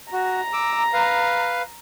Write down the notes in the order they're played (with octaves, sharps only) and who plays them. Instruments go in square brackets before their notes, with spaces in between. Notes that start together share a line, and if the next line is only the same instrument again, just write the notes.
[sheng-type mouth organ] F#4 [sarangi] A#5
[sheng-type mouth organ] D6 E6
B4 F5